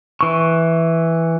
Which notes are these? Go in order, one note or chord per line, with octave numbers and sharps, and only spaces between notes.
E3 C#6